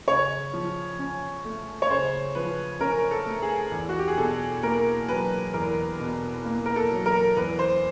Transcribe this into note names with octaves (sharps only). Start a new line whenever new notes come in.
C#3 C#5
F3
C#4
A3
C#5
C#3 C5
F3 B4
C#4 A#4
A4
A3
G#4
E2
F#4
G4
G#4
B2 A4
A#3 A#4
F#3 B4
E2 A#4
B2
A#3
A#4
A4
F#3
A#4
E2 B4
C5